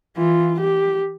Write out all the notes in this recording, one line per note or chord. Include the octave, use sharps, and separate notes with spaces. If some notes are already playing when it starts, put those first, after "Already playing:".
E3 F4
G4